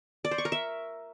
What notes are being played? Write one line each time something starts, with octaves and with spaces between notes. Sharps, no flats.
D5
C5
C#6
A#4
E5